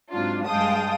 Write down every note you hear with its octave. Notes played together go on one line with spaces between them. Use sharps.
G#2 F#3 C4 D4 F4
G2 G#3 F5 G5 A5 D#6